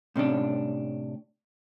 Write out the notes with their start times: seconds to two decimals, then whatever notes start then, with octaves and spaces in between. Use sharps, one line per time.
0.16 A2 C3 C#4 D4